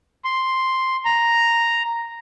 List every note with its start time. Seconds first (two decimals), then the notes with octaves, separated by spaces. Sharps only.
0.24 C6
1.05 A#5